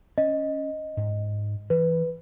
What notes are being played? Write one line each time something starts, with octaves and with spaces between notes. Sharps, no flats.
C#4 D#5
G#2
E3 B4